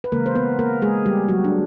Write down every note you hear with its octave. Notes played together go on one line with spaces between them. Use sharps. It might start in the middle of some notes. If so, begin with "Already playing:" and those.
B4
C#3 E3 G#3 A#3 A#4
C5
B3 B4
A#3 A#4
G#3 G#4
G3 G4
F#3 F#4
D4